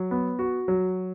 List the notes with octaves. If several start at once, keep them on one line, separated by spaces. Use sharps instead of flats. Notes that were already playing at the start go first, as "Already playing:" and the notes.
Already playing: F#3
B3
F#4
F#3